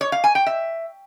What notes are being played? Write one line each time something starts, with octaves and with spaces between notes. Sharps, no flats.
C#5
F5
G#5
G5
E5